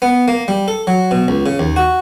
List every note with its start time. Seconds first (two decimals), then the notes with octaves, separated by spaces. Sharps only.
0.02 B3
0.28 A#3
0.48 G3
0.68 A4
0.87 F#3
1.11 B2
1.28 C#2
1.46 C#3
1.59 D#2
1.76 F#4